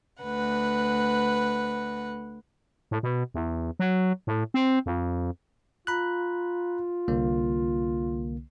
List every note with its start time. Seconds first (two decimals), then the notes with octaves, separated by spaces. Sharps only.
0.23 D2 B4 F#5
2.91 A2
3.03 B2
3.34 E2
3.79 F#3
4.27 A2
4.54 C4
4.86 F2
5.87 F4 A#5 B5 F#6
7.08 C2 D3 A#3